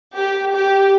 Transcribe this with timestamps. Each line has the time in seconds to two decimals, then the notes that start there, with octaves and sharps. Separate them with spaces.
0.15 G4
0.55 G4